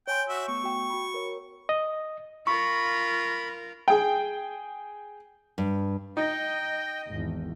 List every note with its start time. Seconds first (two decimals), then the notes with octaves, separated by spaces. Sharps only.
0.08 C#5 G5 G#5 C6
0.29 F#4 E5
0.48 A3 B3 C#6
0.64 F#4 G5
0.90 F#4 B5
1.14 A#4 C#5
1.69 D#5
2.47 F4 A#4 B5 C#6
3.88 G#4 G5
5.58 G2
6.17 D#4 D#5 G5
7.07 G#1 E2